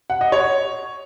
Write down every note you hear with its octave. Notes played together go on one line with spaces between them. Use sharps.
F#5
D#5
C#5